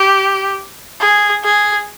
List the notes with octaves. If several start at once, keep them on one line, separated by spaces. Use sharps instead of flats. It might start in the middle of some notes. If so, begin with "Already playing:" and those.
Already playing: G4
G#4
G#4